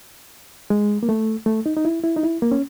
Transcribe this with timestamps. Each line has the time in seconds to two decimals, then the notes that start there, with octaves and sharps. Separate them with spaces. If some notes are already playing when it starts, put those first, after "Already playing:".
0.70 G#3
1.03 A#3
1.09 A3
1.46 A3
1.66 D#4
1.77 D#4
1.85 E4
2.04 E4
2.17 D#4
2.23 E4
2.42 A#3
2.52 C#4